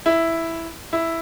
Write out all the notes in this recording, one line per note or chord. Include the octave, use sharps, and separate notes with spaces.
E4
E4